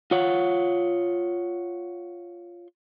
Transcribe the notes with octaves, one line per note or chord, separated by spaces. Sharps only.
F4 C#5 F#5